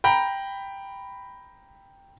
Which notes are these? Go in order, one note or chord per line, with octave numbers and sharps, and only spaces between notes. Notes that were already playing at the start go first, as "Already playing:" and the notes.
G5 A#5 B5